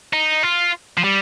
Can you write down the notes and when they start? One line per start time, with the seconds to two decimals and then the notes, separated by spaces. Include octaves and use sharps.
0.13 D#4
0.43 F4
0.97 F3
1.04 G3